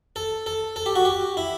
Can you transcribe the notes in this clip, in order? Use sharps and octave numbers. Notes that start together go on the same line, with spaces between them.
A4
A4
A4
G4
F#4
G4
E4